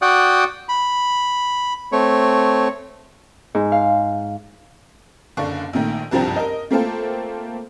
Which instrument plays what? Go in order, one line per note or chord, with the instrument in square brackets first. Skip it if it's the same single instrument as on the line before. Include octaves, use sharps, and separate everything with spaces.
[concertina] F#4 D5 F#5 G5 D#6
B5
A3 C4 C#5
[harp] G#2
F5
[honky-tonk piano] F#1 D3 D4 F5 C#6
A#1 A#2 D#3 A3
F#1 C2 G2 F3 C4 A#5
A#4 D#5
A3 A#3 C4 F4 A4 C5